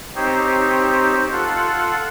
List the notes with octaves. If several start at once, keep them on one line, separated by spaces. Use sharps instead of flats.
C4 D#4 G4 C5 C#5
F4 A4 F#5